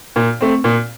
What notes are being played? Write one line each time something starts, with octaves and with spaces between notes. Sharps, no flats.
A#2
A3 C4
A#2